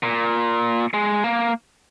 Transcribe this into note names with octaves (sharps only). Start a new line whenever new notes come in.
A#2
G#3
A#3